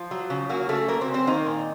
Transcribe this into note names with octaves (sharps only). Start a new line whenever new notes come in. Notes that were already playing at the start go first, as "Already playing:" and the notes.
Already playing: F3 F4
F#3
C#3
F#3 A#3 F#4
C#3 A3 A4
F#3 A#3 A#4
C4 C5
C#3
C4 C5
D#3 A#3 D#4
A#2